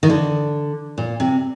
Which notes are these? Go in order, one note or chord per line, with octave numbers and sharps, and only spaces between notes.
D#3
D3
A#2
C3